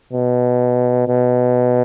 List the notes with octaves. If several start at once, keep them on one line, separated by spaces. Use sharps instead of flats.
B2
B2